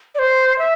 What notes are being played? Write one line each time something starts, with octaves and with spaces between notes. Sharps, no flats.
D5
C5
E5